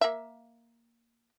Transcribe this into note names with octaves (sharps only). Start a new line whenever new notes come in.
A#3 E5